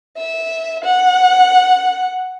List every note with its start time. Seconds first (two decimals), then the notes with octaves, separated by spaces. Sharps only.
0.17 E5
0.84 F#5